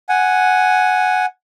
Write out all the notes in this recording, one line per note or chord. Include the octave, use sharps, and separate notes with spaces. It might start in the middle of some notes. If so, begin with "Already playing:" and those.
F#5 G#5